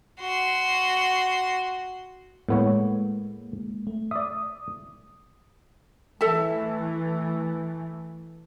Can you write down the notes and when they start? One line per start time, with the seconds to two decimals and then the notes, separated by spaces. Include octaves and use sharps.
0.21 F#4 C6
2.49 A2 G#3 A#3 B3 C#5
3.87 A3
4.11 D5 E5 D#6
6.21 E3 A3 A4 E5 A5